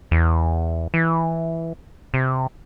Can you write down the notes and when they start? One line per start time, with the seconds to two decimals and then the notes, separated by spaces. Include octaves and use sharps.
0.11 E2
0.94 E3
2.14 C3